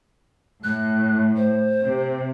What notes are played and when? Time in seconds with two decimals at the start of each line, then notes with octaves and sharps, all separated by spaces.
0.64 A2 F#6
1.36 C5
1.81 C3